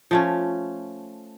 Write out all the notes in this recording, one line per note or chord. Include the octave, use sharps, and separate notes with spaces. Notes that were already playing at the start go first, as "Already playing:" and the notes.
F3 A3 C#4